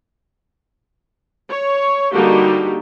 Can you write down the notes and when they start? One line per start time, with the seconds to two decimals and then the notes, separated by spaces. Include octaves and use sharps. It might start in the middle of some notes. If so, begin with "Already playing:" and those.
1.49 C#5
2.13 D3 G3 A#3 D#4 F#4 G4